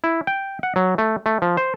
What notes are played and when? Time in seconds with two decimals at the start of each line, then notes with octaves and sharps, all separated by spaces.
0.04 E4
0.27 G5
0.63 F#5
0.76 F#3
0.98 A3
1.26 A3
1.42 F3
1.57 C5